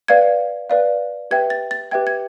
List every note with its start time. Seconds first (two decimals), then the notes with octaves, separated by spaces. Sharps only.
0.08 B4 D5 F5 G#6
0.70 B4 D5 F5
1.31 G4 B4 E5 G5 G#6
1.50 A6
1.71 A6
1.91 G4 B4 E5 G5 G#6
2.07 G#6